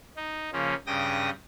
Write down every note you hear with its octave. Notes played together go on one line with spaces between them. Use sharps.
D#4
C#3 F3 A#3 C#4
G2 C#3 G5 D#6 A#6